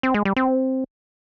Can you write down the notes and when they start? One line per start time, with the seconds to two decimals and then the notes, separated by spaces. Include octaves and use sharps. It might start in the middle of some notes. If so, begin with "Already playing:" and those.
0.03 C4
0.14 G#3
0.25 G3
0.36 C4